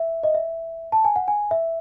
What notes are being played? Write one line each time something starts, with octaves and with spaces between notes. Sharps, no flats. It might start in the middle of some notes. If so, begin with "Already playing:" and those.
Already playing: E5
D#5
E5
A5
G#5
F#5
G#5
E5